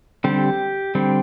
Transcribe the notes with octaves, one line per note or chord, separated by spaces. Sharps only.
D3 G3 C4 G4
D3 G3 C4